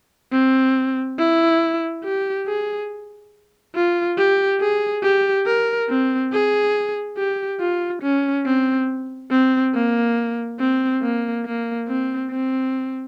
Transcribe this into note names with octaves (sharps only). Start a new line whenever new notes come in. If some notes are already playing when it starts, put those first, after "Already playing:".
C4
E4
G4
G#4
F4
G4
G#4
G4
A#4
C4
G#4
G4
F4
C#4
C4
C4
A#3
C4
A#3
A#3
C4
C4